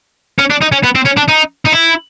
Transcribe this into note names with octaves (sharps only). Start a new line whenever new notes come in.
C#4
D4
D#4
C#4
B3
C4
C#4
D4
D#4
D#4
E4